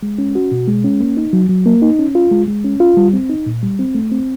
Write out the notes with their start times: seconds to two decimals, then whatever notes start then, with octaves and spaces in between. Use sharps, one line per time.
0.03 G#3
0.18 C#4
0.35 F#4
0.51 B2
0.68 G#3
0.84 C#4
1.00 A#3
1.17 D#4
1.33 F#3
1.49 F#3
1.66 A#3
1.82 D#4
1.99 C#4
2.15 F4
2.31 G#3
2.48 G#3
2.65 C#4
2.80 F4
2.97 G3
3.13 C4
3.29 D#4
3.46 A#2
3.63 G3
3.79 C4
3.95 A3
4.12 C4